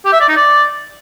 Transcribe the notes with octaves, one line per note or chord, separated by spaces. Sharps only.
G4
E5
D5
D#4
D5